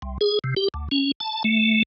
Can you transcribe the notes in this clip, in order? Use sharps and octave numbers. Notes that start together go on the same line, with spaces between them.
C2
G#4
C3
G4
D2
C#4
A5
A3